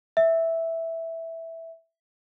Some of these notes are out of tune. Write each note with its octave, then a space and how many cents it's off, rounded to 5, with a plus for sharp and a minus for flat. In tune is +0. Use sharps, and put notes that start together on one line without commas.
E5 -5